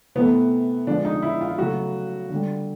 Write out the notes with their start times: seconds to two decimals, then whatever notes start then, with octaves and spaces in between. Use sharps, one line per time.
0.15 C3 E3 A3 B3
0.87 D3 F3 G#3 D4
1.05 D#4
1.22 E4
1.41 F4
1.58 C#3 F#3 A3 F#4
2.30 D3 G3